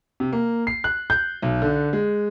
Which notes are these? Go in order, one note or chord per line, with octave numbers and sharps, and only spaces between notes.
C3
A#3
C7
F#6
G6
B1
D3
G#3